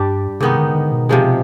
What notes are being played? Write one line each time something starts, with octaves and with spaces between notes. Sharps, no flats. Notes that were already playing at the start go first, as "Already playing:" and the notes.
Already playing: G2 G3 D4 G4
G#2 C3 D#3 B3 D#4
D3
D3
B2
C3 F3 G#3